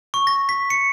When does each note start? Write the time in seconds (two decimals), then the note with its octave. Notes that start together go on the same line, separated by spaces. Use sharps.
0.14 C#6
0.27 A#6
0.49 B6
0.70 C#7